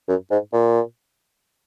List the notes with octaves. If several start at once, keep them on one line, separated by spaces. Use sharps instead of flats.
F#2
G#2
A#2